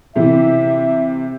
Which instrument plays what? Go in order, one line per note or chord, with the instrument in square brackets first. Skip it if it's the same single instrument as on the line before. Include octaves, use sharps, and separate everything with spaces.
[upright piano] C3 E3 [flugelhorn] E5